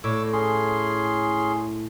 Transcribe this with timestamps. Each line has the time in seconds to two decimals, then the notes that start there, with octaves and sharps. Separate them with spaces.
0.04 A2 C#5 D6 E6
0.33 C#4 G#4 C6